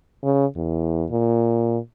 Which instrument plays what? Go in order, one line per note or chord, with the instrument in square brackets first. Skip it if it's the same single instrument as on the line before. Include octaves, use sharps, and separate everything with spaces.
[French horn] C#3
E2
A#2